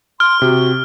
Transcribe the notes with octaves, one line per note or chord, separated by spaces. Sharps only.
C6 F6
C3 F#4